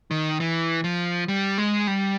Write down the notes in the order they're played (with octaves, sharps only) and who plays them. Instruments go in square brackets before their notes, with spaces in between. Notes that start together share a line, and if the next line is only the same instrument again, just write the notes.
[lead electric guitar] D#3
E3
F3
G3
G#3
G3